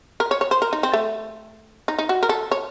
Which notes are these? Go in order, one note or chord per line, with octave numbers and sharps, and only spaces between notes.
A#4
C#5
C#5
C5
A#4
D#4
C4
A3
D#4
D#4
F#4
A#4
A4
C#5